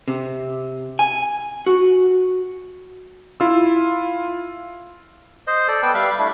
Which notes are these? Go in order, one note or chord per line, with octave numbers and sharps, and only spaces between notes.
C3
G#5
F#4
E4 F4 E6
C5 D#5
A4 D5
B3 B4 G5
G3 B4 E5 F5
A3 D4 E4